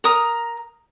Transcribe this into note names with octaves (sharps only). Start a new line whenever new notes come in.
A#4 A#5 D#6